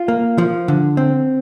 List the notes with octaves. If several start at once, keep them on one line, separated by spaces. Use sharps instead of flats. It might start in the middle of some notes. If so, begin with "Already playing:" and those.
Already playing: F4
A#3
F3
D3
C4